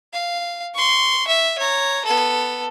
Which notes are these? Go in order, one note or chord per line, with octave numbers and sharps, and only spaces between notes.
F5
C6 C#6
E5
C#5 A#5
B3 A4